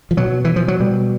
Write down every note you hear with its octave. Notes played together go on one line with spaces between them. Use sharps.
F3
B2 F#3
E3
F3
F#3
B2 G3